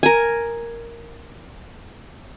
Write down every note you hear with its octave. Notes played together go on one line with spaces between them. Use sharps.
A#4 G#5